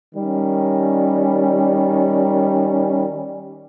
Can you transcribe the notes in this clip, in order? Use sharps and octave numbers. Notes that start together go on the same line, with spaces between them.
D#3 G3 C#4